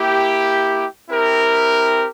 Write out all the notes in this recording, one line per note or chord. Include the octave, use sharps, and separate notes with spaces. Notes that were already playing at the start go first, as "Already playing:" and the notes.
Already playing: A#3 E4 G4
C4 E4 G4 A#4